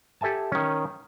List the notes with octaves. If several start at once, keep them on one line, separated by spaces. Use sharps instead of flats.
G4 A4 E5 G#5 A5
D#3 C#4